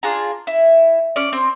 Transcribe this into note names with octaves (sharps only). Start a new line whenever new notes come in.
D4 F4 G#4 A#5
E4
C#4 D5
C4